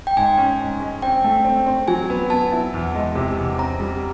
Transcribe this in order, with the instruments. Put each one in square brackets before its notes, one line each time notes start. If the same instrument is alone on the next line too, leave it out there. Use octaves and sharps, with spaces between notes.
[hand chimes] G5
[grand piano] G#2 [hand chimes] G#5
[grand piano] C#4
G#2
G#3
[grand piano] C4 [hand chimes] G5
[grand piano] A3
C4
C4
[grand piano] F#3 [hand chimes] G#5
[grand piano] B3
[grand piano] B3 [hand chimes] A5
[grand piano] E4
E2
G#3
C3
E2
[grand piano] C4 [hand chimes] A#5
[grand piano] G3